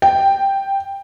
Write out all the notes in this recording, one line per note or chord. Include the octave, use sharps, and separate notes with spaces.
G5